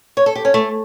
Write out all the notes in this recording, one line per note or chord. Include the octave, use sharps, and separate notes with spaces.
C#5
A4
G4
C#4
A3